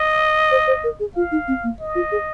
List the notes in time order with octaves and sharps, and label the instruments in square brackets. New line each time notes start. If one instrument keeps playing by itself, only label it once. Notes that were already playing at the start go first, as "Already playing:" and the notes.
Already playing: [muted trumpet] D#5
[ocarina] C5
C5
A#4
G#4
[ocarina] F4 [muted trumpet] F5
[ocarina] D#4
C4
A#3
[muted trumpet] D#5
[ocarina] F4
G#4